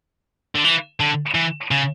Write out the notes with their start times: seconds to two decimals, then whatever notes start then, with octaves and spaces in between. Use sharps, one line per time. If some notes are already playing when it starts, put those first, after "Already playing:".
0.55 D3
0.64 E3
1.00 D3
1.35 E3
1.71 C#3